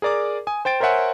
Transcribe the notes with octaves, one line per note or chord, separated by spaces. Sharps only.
G#4 A#4 D5 A#5 D6
G#5 D#6
C5 G5 A6 D7
A#4 C5 C#5 E5 F#5 G#5